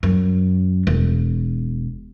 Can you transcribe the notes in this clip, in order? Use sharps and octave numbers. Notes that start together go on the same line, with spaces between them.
F#2
E1